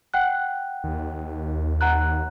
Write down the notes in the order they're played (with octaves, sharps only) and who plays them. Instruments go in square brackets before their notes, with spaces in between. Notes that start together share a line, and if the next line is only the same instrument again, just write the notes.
[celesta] F#5 G5 F#6
[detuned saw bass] D#2
[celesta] F#5 A#5 F#6